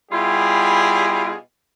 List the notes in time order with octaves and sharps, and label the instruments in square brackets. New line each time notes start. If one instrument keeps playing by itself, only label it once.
[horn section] B2 G3 E4 F4 G4 G#4